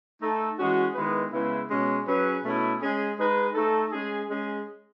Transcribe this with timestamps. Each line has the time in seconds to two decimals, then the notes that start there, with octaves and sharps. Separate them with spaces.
0.20 A3 D#4 A4
0.57 E3 G#3 C#4 F#4
0.94 D#3 G#3 B3 E4 B4
1.31 C#3 G#3 B3 E4
1.69 B2 G#3 C#4
2.06 F#3 C#4 G#4 B4
2.44 B2 A3 C#4 E4
2.80 G#3 C#4 G#4
3.17 G#3 D#4 G#4 B4
3.54 A3 D#4 A4
3.92 G#3 C#4 G#4
4.29 G#3 C#4 G#4